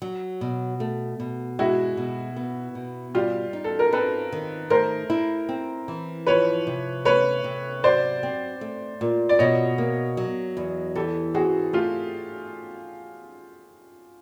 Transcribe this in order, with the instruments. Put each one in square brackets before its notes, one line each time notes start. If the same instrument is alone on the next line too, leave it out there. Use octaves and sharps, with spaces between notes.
[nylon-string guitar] F#3
B2
A3
B2
[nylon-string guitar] G#3 [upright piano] E4 F#4
[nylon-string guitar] B2
B3
B2
[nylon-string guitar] G3 [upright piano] F4 G4
[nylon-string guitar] D#4
[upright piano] A4
A#4
[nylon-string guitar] C4 [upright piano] A4 B4
[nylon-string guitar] D#3
[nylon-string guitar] A3 [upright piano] A#4 C5
[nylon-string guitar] E4
C4
E3
[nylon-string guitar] F3 [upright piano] B4 C#5
[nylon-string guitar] C3
[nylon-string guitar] A3 [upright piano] B4 C#5
[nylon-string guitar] C3
[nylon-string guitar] F#3 [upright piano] C5 D5
[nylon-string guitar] C4
A3
A#2
[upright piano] D5
[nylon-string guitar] B2 [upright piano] C#5 D#5
[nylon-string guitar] A#3
F#3
E2
[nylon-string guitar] E3 [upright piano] G4 A4
[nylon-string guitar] C4 [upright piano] F#4 G#4
[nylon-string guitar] A3 [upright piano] F4 G4